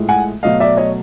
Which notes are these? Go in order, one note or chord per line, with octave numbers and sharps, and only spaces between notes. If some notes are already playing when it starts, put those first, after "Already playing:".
Already playing: A2 F3 G#3
F#5 G#5
B2 F#3 A3 D#5 F5
D5 E5
C#5 D#5